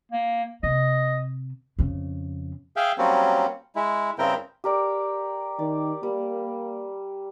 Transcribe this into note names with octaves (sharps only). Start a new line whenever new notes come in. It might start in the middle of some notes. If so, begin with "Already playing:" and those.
A#3
C3 D#5
F2 C#3
G#4 E5 F5 G5
F#3 G3 A#3 C4 C#4
G#3 E4
G2 C#3 C4 E4 A#4 G5
G4 A#4 D5
D#3 D5
G3 A#3